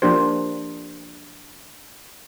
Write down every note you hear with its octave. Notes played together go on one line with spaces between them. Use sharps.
F3 A#3 D4 G4 C5